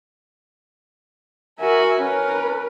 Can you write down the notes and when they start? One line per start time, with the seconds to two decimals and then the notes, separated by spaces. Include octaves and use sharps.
1.59 F#4 A#4 E5 G#5
2.00 C#4 A#4 B4